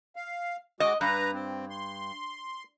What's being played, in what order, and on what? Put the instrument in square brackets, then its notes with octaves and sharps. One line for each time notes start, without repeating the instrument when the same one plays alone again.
[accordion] F5
[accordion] G#3 F#4 D6 [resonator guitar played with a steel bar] D#5
[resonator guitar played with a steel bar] G2 [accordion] B4 A#5
[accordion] C4
C6